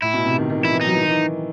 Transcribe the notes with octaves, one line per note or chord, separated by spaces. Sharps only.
A2 E4
B2
C3
D#3
D#3
E3
E4
E3
F#3 D#4
E3
D#3
E3